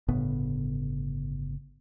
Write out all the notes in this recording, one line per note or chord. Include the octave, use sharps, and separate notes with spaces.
G1 A2 C#3 B3